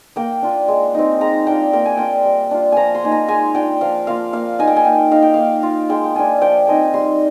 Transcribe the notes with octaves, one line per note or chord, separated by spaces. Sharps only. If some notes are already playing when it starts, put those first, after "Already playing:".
A#3 G5
D4 F4
G#3
C4 D#4
G#3 A#5
D4 F4 G5
A#3 G5
G#5
D4 F4 G5
G3
D4 F4
F3 G#5 A#5
C6
A#3 D#4 G#5
A#5
G#3 G#5
D4 F4 G5
F3 F5
A#3 F4 F5
A#3 F5
D#4 G#5
G5
G#5
A#3 G5
D#4 F5
G5
A#3 F5
F4
G#3 G5
G5
D4 F4 G#5
F3 G5
C4 D#4 G#5
G3 C6